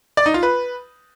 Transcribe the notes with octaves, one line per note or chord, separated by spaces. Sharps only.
D5
D#4
F4
B4